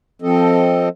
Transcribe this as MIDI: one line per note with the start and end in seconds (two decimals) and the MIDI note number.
0.22 0.89 53
0.22 0.89 60
0.22 0.89 69
0.22 0.89 75